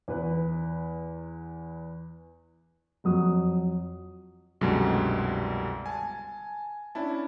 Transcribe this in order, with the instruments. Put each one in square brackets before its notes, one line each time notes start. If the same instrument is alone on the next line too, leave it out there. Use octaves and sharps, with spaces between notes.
[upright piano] E2 B4
[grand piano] F2 F#3 D#6
[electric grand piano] C2 F#2 B2 D3 G3 G#3
G#5 A5
C#4 D4 E4 A5